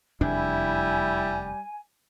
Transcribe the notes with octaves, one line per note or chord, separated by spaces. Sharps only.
F1 E2 G3 D4 E4 G#5